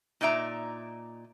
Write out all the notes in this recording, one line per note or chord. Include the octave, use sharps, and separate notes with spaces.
A#2 D#4 D5 E5 A#5